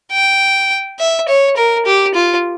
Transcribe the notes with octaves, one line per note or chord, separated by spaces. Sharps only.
G5
E5
C#5
A#4
G4
F4